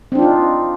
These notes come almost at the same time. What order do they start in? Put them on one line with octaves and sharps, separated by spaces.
C4 D4 F4 D#4